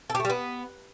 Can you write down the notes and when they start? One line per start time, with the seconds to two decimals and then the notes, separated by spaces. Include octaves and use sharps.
0.10 A4
0.15 G4
0.20 A3
0.25 G3
0.30 B3